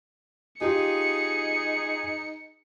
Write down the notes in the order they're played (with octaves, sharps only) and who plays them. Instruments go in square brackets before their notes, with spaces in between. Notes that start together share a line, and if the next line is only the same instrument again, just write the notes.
[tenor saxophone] D#4 [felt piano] F4 G4 [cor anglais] G#4 [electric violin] C#7